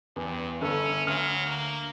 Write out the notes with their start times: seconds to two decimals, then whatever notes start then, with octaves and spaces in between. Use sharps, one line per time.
0.16 E2 G2
0.61 G1 C#4 A4
1.07 D2 F#3 F6
1.46 A#3